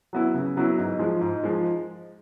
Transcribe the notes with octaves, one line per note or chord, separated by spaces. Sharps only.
F#3 B3 E4
C#3
F#3 B3 E4
G#2
F3 G#3
G#2
F3 G#3